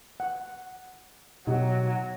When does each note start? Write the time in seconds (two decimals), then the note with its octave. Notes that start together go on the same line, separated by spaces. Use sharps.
0.20 F#5
1.47 B2 F#3 D#4 G4